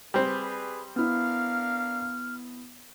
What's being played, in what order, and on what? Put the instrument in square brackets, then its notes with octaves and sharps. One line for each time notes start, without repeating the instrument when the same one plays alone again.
[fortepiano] G3 C4 [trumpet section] G#4 B4
[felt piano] B3 E4 [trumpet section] D4 A#4 F5 [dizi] F6